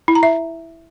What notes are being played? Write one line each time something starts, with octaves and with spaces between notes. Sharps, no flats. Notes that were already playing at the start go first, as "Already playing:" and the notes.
E4
A#5
E5